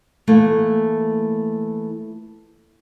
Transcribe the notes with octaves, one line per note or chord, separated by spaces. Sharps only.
E3 A3 A#3